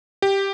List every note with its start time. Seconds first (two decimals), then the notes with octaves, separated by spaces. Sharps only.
0.22 G4